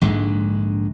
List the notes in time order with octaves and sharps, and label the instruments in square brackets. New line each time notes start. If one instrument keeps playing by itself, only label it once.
[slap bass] A#1 G#2 D3 G#3